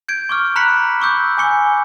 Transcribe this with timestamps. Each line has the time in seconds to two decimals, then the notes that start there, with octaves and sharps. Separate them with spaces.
0.08 G6 G#6 D7
0.29 C#6 D6 F6
0.56 A#5 B5 F#6 B6 C#7 F#7
1.01 C#6 D6 E6 G6
1.38 G#5 D6 C#7 G7